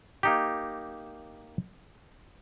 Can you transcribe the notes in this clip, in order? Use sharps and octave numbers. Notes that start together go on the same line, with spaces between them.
A#3 D#4 G4